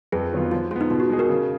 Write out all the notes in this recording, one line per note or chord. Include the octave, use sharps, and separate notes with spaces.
F2 G#4 B4
D#3 F#3 B3 F4
F3 F4
G#3 B3 F4
D#4
B2 F4
F#4
G#3 D#4 G#4
F#4 A#4
C#3